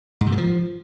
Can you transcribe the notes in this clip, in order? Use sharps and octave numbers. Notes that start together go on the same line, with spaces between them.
G#2
C3
D#3
F3